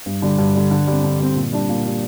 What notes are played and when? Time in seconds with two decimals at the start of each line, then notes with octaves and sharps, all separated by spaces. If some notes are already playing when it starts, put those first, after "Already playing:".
0.06 G2
0.22 D3 G3
0.38 G2
0.55 D3 G3
0.71 D3
0.87 G3 C4
1.04 D3
1.20 G3 C4
1.36 A#2
1.53 G3 D4
1.69 A#2
1.85 G3 D4